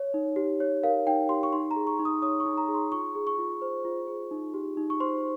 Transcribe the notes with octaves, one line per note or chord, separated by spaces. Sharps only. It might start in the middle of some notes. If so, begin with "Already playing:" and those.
Already playing: C#5
D#4
G4
C#5
A#4 F5
D#4 G5
G4 C6
C#6
D#4 C6
A#5
G#4
C#6
D#4 C#6
D#6
C#5 D#6
C#6
D#4
A#5
G#4
C6
F4 C#6
G#4
C#6
F4
C5
F4
G#4
D#4
G4
D#4
C#6
C5 C6